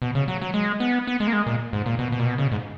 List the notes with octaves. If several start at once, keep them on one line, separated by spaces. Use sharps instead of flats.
B2
C#3
F#3
F#3
G#3
B3
B3
G#3
A#3
G#3
A#2
G#2
A#2
B2
B2
A#2
B2
C#3
G#2